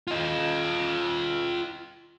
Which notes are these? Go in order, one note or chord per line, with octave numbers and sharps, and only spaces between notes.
F4 D#5